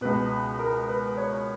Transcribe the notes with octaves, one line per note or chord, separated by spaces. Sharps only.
C#2 B2 B4
A#4
B4
C#5